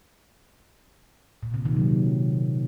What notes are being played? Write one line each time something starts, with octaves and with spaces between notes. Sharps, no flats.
A#2
C3
D#3
F#3